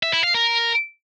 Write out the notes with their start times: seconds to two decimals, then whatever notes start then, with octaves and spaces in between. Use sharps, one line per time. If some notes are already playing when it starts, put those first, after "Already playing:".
0.03 E5
0.13 E4
0.24 F5
0.34 A#4